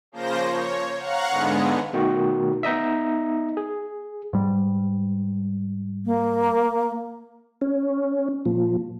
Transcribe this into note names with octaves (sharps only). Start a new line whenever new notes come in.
C#3 F3 A#3 C5 G6 A#6
C#5
F5 F#5 A#5 C#6 F#6
G#2 D3 G#3 B3
B2 D#3 A3 F#4
B3 D#4 D#5 E5
G#4
G#2 G3
A#3
C#4
A#2 F3